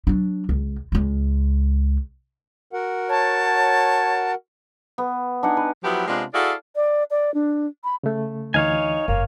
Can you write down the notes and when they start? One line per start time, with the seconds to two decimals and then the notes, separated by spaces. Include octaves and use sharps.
0.07 F#3 D4
0.49 C#2
0.92 C#2 G#3
2.73 F#4 A#4 F#5
3.10 C#5 A5
4.98 B3
5.43 D4 D#4 F#5 G#5
5.57 B4
5.83 F3 F#3 B3 E4 F#4 G4
6.08 C3 G#3 B3 D4 F4
6.34 E4 F#4 G#4 A4 D5 F5
6.76 D5
7.10 D5
7.34 D4
7.84 B5
8.03 C#3 A3
8.54 D2 E3 D#4 C#5 F5 G#5
9.08 F#1 G2 A#3